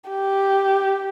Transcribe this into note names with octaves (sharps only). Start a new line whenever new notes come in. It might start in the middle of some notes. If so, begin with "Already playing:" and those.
G4